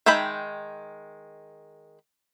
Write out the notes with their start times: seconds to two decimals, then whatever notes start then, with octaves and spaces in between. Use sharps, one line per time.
0.06 D#3 G#3 E5 G5 B5